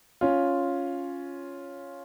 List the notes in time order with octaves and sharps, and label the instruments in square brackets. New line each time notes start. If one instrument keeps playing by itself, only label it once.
[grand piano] C#4 F4